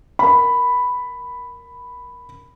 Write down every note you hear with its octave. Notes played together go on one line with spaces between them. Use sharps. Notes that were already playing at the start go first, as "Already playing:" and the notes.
A#4 B5